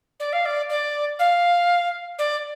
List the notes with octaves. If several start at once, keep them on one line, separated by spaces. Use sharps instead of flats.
D5
F5
D5
D5
F5
D5